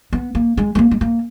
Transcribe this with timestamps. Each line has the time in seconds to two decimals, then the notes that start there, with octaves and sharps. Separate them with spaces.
0.13 B3
0.35 A#3
0.57 G#3
0.75 G#3
0.79 A#3
0.91 G#3
1.01 A#3